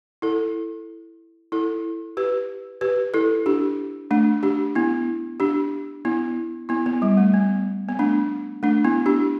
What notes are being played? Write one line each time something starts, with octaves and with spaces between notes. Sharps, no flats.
E4 A4
E4 A4
G4 B4
G4 B4
E4 A4
D4 G4
A3 D4
D4 G4
B3 E4
D4 G4
B3 E4
B3 E4
B3
G3
A3
B3
B3
A3 D4
A3 D4
B3 E4
D4 G4